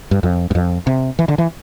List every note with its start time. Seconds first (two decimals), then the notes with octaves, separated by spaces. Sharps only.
0.11 G2
0.23 F2
0.51 G2
0.55 F2
0.87 C3
1.19 E3
1.28 D3
1.38 E3